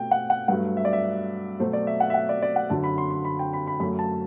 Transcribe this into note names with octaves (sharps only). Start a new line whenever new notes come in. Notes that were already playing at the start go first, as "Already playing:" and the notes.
Already playing: B2 A3 G5
F#5
F#5
G2 F#3 A3 F#5
E5
D5
E5
B2 F#3 A3 C5
D5
E5
F#5
E5
F#5
D5
D5
F#5
F#2 D3 F#3 A5
B5
C6
C6
B5
G5
B5
B5
F#2 F#3 A3 B5
A5